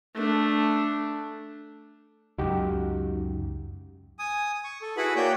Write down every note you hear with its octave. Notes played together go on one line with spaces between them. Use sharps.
A3 D4
C#2 F#2 D#4 F#4 G4
G#5 D#6
C#6
A4
E4 F#4 G#4 B4 F#5 B5
A#3 F#4 C#5 D5 G5 G6